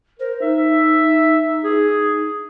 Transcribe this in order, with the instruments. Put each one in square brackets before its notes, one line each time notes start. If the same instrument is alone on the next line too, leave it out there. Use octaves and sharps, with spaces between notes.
[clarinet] A#4 [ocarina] C5
[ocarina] D#4 [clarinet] E5
[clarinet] G#4